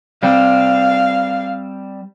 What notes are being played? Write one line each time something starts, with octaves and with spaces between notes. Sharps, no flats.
G3 C4 F5